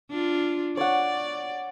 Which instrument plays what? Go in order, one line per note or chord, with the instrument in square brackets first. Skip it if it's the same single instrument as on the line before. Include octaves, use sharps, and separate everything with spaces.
[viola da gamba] D4 F4
[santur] C#5 F#5 [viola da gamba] D5